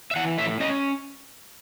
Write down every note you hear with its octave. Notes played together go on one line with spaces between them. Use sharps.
E5
E3 F#5
A2 E5
C#4 D#5